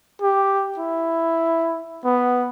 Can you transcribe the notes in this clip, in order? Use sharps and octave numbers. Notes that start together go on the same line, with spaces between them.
G4
E4
B3